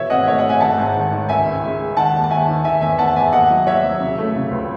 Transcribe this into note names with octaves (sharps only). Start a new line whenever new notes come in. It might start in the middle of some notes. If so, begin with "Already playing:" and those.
Already playing: B2 E3 C#5 E5
G#1 D#5 F#5
A3 C#5 E5
D#5 F#5
A3
E5 G#5
A1 F#5 A5
G#2
D#3
D#3
C#2 E5 G#5
C#2
G#3
G#3
D#3 F#5 A5
D#2
A5
D#2 E5 G#5
D#3
D#3 E5 G#5
E2 E5 G#5
E2 F#5 A5
E2 E5 G#5
D#2 D#5 F#5
F#3
D#2 C#5 E5
F#3
C#3
A3
C#3
C#2